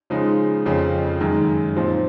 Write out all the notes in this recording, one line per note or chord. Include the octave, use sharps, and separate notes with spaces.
C#3 F3 G#3 D#4
F2 C#3 F3
F#2 D#3 G#3
A#2 F3 C4 D#4